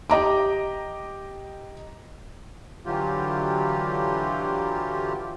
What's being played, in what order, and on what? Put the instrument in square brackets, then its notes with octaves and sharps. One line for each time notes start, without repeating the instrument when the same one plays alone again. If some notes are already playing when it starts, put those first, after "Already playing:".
[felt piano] G4 D#5 A#5 D6
[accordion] D3 E3 F#3 F4 G4